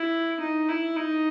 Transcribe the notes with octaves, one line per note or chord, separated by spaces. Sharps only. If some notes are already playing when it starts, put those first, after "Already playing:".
Already playing: E4
D#4
E4
D#4